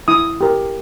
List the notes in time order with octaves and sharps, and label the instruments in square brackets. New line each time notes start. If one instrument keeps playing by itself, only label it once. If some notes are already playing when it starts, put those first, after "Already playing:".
[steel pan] E4 D#6
G4 A#4